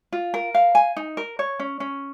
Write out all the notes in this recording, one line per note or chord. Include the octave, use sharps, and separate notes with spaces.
F4
A#4
F5
G#5
D#4
A#4
C#5
C#4
C#4